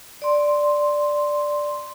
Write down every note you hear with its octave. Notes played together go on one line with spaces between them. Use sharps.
D5 C6